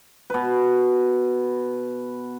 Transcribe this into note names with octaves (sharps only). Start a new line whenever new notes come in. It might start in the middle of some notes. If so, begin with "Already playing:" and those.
B2 B4